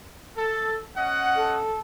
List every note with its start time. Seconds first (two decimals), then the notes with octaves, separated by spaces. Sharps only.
0.38 A4
0.97 C#4 D#5 F#5
1.36 A4